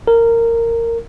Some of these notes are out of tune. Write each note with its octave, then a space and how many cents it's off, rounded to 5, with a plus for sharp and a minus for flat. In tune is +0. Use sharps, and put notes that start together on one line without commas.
A#4 -15